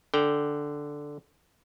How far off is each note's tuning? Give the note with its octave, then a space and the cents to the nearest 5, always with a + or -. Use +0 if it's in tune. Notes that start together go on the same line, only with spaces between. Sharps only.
D3 +0 G5 +0